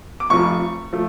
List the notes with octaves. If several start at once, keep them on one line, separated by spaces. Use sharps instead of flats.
D6
F1 F2 F3 C#6
F3 A3